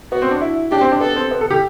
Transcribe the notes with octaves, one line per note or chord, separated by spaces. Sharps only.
B3 F#4
C4
D4
E4
D4 G4
C4
D4
B3 A4
C4
B3
A4
G4